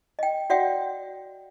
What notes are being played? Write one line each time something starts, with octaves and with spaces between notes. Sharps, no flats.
D#5 G5
F#4 D5 E5 F#5 G5